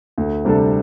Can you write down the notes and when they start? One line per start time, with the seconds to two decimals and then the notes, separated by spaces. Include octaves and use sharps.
0.18 D2
0.45 C3 G3 D4 A4